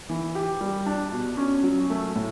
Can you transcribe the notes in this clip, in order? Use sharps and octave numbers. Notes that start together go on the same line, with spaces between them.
E3
G4
G3
D4
B2
C#4
F#3
A3
A2